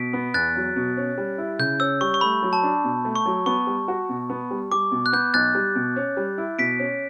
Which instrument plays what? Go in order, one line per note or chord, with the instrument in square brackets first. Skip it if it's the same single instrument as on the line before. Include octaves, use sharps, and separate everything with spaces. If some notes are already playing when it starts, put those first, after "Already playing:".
Already playing: [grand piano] B2 [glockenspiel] B6 D7
[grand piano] B3
[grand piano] E2 [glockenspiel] F#6 A6
[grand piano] F#3
B2
C#4
G3
E4
[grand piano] C#3 [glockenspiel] G6
[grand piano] C#4 [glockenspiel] E6
[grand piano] G3 [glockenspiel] C#6
[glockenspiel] C#6
[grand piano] A3 [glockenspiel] B5
[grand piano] F#3
[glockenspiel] A5
[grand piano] D4
B2
A3
[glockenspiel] C#6
[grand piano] F#3
[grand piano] B3 [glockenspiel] C#6
[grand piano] G3
F#4
B2
B3
G3
[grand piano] G3 [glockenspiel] D6
[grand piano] B2
[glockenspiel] F#6
[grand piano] B3 [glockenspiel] G6
[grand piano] B1 [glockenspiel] F#6 A6
[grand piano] G3
B2
C#4
G3
E4
[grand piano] B2 [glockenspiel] B6 D7
[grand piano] C#4